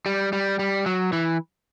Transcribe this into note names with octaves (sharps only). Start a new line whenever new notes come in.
G3
G3
G3
F#3
E3